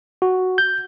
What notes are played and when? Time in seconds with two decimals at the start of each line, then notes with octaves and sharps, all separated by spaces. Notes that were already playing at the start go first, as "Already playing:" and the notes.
0.22 F#4
0.58 G6